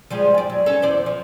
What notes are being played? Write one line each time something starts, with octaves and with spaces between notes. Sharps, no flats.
F3 G3 G#3
F#2 D5
F#3
C#4 A4
E2 C5 D5
F3